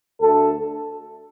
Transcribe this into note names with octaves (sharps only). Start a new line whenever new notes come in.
D2 D3 A3 A4